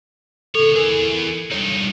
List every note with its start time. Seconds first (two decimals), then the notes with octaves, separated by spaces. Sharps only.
0.55 D3 A4 C#5
0.75 E3 G#4 A#4
1.52 G2 D#4 C#5